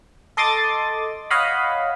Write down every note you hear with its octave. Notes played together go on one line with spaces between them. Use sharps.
A4 D#5 C6 D6 D#6 A6
C#5 D#5 F5 F#5 B5